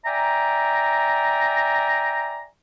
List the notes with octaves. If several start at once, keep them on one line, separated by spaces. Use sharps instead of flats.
D5 E5 G5 G#5 A#5